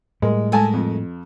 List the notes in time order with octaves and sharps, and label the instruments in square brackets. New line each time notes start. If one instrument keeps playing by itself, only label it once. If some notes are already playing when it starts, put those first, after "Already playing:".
[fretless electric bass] A2 G3 [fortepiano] G#3 A#4
[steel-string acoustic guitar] G#3 A3 A#4 [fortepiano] A4 G#5 A5
[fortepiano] F2